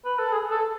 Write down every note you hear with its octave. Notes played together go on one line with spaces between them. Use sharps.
B4
A4
G#4
A4